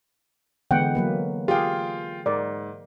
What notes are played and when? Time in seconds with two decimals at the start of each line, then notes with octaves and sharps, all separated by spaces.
0.71 D3 E3 G#3 B3 F#5 G5
0.95 F#3 A#3 B4
1.48 F4 G4 G#4 F5 G5
2.26 G#2 A#4 D5